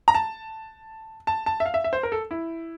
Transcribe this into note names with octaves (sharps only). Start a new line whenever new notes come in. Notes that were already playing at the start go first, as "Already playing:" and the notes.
A#5
A5
A5
A5
E5
F5
E5
E5
C5
A#4
A4
E4